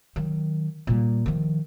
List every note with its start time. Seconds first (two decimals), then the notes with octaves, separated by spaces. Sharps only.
0.16 D#3 F#3
0.87 A#2 G3
1.26 D#3 F3